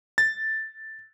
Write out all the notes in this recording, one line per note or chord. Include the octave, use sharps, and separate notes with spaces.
A6